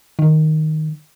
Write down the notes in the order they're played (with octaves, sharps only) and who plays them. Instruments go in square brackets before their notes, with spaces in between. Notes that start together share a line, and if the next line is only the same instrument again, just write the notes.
[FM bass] D#3